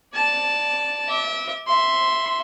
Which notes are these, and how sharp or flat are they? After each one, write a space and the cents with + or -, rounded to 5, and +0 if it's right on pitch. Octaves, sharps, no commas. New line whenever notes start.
D5 +0 A5 -5
E5 -35 D6 +0
E5 +0 C6 +0